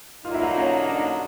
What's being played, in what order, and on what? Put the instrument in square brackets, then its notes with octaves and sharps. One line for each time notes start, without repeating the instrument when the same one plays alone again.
[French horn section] D3 F#3 A#3 D#4 [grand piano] F4
[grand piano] E4
F4
C#4
D4